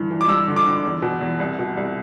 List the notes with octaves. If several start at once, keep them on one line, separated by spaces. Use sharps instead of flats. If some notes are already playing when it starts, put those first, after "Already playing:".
Already playing: G2 D3 E3
E3
D6
G2 E6
D3
D6
D3
E2
B2
E2
C2
B2
C2